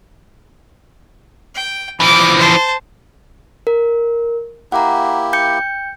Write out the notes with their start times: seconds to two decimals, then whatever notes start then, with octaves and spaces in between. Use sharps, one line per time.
1.55 G5
2.00 E3 F3 D6
2.38 C5 A5
3.67 A#4
4.72 A#3 E4 G4 F#5 A#5
5.33 G5 G6 C#7